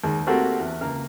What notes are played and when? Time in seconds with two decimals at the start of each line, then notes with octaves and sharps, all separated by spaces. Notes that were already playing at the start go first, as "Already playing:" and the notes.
0.04 D#2 G#3
0.27 A3 A#3 C4 F#4 G4 A4
0.60 E2
0.81 C#2 A#3 A#4